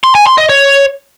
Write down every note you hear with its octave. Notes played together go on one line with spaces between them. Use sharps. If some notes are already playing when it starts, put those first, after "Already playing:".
C6
G#5
C6
D#5
C#5